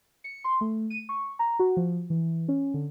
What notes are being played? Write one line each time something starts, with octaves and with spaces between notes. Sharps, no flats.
C#7
C6
A3
D#7
C#6
A#5
F#4
F3
E3
C#4
D3